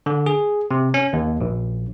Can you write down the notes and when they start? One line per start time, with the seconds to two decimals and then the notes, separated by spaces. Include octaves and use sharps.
0.06 D3
0.26 G#4
0.71 C3
0.94 C#4
1.13 D#2
1.41 A#1